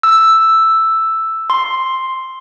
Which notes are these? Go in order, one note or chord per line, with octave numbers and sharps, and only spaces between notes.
E6
C6